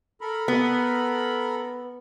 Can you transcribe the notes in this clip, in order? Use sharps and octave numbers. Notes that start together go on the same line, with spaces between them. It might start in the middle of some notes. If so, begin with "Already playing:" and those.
A4 A#4 B5
B3